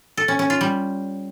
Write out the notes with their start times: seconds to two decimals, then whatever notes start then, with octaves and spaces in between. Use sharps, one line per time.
0.17 A4
0.28 C#4
0.39 C#4
0.50 F4
0.61 G3